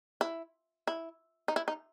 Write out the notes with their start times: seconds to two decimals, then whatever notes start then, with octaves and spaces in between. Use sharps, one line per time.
0.21 E4
0.87 E4
1.48 D#4
1.56 E4
1.68 D#4